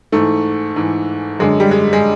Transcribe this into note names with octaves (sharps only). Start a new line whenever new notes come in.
G#2 E3 A3
G#2 E3
F#2 D3 G#3
G3
G#3
G#3